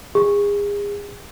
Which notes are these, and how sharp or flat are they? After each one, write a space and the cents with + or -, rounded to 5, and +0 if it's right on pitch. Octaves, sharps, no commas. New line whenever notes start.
G#4 -35